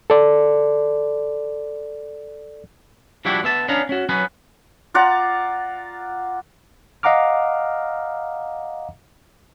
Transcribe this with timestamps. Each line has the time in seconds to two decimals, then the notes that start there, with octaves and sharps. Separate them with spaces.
0.10 A4 D5
3.25 F3 G3 D4 E4 F#4 G4
3.43 D3 B3 E5 A5
3.68 B3 C#4 D4 F5 A#5
3.89 C#4 F#4
4.09 F#3 B3 C#4 F#4 B4
4.94 F4 D5 F#5 A#5
7.03 D#5 F5 F#5 A#5 D6 F6